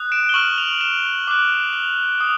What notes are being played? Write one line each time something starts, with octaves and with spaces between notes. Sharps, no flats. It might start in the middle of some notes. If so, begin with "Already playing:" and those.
Already playing: D#6 F#6
D7 E7
G7
C#6 F6 E7 F#7
F7 G7
E7 F#7
D6 F#6
F7 G7
D#6